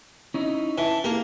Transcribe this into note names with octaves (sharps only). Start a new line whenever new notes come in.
C#4 D#4 E4
E3 A5
A#3 G4 G#4